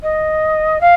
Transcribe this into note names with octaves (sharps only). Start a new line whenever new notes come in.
D#5
F5